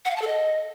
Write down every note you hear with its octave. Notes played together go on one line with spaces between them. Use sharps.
F#5
F5
A5
A4
D#5